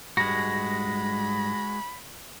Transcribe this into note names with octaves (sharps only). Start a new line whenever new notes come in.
G#2 G3 G#3 F#4 B5 A#6